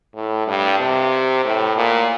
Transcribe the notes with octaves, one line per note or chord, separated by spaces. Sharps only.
A2
G2
C3
A2
A#2